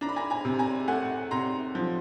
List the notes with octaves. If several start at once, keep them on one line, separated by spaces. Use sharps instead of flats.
D4 A#5
B5
G#5 A#5
G#5 A#5
C3
G#5 A#5
A3 F#5 G#5
C3 A#5 C6
F3